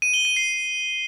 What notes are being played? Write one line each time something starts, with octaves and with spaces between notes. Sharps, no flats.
D#7
G7
D#7
C7